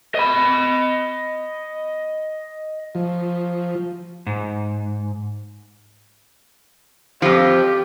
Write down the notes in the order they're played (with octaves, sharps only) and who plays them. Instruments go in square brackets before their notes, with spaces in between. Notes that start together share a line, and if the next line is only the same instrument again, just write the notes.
[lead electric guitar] D#5 B5
[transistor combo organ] F3
[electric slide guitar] G#2
[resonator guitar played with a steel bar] F2 F3 [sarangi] G4